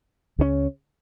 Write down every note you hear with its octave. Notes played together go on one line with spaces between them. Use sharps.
C#2 C#3 G#3 C#4